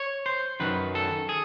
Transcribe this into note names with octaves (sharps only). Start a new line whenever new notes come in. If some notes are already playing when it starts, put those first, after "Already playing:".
Already playing: C#5
C5
F#2 D#3 F#3 B4
A4
G#4